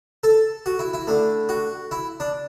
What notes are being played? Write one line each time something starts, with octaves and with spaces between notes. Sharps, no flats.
A4
F#4
E4
E4
D3 A3
F#4
E4
D4